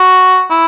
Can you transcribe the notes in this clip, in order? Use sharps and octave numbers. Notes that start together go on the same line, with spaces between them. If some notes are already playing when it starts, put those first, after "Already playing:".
Already playing: F#4
E4